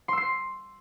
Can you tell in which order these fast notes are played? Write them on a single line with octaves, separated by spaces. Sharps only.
C6 E6 C7